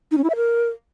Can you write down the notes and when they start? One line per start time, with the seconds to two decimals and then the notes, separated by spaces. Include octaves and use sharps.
0.11 D#4
0.18 C#4
0.24 E4
0.30 E5
0.36 A#4